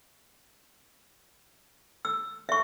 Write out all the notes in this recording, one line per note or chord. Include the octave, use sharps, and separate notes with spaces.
E6
E5 C#6